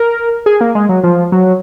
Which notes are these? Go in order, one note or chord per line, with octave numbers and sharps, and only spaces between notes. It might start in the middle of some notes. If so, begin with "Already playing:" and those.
Already playing: A#4
G#4
A#3
G#3
F#3
F3
F#3